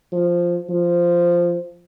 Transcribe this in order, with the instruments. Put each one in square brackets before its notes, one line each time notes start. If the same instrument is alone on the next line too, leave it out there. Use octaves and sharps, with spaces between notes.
[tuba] F3
F3